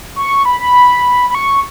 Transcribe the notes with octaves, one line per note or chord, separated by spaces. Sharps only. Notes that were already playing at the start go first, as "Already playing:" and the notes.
C#6
B5
B5
B5
C#6